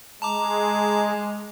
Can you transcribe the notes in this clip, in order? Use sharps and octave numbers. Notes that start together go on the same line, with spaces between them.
G#3 A5 A#5 D6